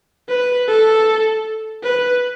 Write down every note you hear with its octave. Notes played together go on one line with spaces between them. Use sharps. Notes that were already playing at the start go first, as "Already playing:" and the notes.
B4
A4
B4